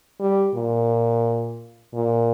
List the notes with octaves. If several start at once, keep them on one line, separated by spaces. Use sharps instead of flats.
G3
A#2
A#2